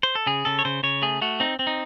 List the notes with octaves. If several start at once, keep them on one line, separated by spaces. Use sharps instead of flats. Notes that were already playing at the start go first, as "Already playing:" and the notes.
C5
A4
C#3 G#4
C#3 A4
C#5
C#3 C5
C#3 C#5
A3 G#4
A3 F#4
C4 D#4
C4
D#4